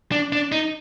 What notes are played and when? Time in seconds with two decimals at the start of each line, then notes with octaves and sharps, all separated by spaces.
0.12 D4
0.32 D4
0.52 D#4